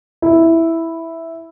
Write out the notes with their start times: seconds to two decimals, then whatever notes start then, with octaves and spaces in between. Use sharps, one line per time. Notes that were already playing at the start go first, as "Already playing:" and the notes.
0.22 E4